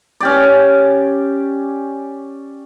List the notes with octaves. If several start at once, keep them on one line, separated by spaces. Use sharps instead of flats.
C#4 G4 D5